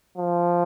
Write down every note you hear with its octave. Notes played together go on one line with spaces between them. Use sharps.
F3